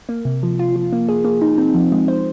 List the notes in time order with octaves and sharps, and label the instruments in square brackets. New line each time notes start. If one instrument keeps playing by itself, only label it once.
[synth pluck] A#3
C3
F3
F4
F3
A#3
G#4
A#3
D#4
C4
F3
G#3
C5